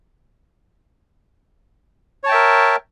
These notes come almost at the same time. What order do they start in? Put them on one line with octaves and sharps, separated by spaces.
C#5 A5 G5 E5 A#4